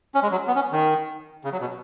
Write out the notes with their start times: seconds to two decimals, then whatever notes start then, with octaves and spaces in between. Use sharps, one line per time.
0.15 C#4
0.23 G#3
0.32 F#3
0.47 B3
0.55 C#4
0.72 D#3
1.45 C#3
1.52 F#3
1.61 B2